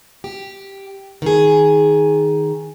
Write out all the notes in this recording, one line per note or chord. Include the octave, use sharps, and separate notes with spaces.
G4
D#3 G#4